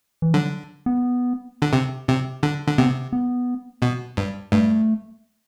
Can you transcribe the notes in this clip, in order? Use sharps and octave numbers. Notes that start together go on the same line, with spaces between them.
E3
D3 F#3
B3
D3
C3
C3
D3
D3
C3 B3
B3
B2
G2
G2 A3